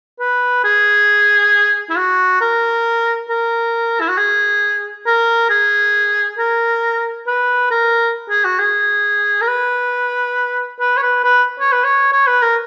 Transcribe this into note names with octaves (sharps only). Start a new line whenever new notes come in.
B4
G#4
E4
F#4
A#4
A#4
E4
F#4
G#4
A#4
G#4
A#4
B4
A#4
G#4
F#4
G#4
A#4
B4
B4
C#5
B4
B4
C#5
B4
C#5
C#5
B4
A#4